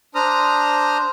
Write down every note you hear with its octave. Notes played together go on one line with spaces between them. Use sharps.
D4 C5 A#5 D#6 F6